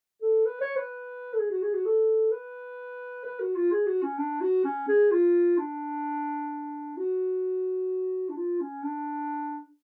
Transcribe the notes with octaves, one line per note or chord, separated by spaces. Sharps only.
A4
B4
C#5
B4
A4
G#4
F#4
G#4
F#4
A4
B4
B4
F#4
F4
G#4
F#4
C#4
D4
F#4
C#4
G#4
F4
D4
F#4
D4
F4
C#4
D4